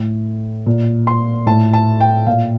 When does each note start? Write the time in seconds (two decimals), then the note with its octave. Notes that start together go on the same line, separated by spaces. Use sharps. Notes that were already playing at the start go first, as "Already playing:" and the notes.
Already playing: A2
0.66 A#2
1.07 C6
1.46 A2 A5
1.73 A5
2.00 G5
2.26 A#2 F5